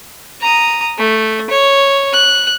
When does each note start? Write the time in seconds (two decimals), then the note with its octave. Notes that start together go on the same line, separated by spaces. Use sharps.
0.41 A#5 D#6
0.99 A3
1.50 C#5
2.13 F#6